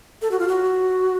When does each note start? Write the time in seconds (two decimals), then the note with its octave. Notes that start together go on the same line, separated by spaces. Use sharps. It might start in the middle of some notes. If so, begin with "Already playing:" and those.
0.22 A4
0.31 F#4
0.39 F4
0.48 F#4